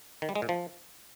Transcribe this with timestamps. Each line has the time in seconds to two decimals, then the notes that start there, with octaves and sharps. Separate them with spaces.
0.22 D#3
0.29 G3
0.36 G#3
0.42 A#2
0.49 F3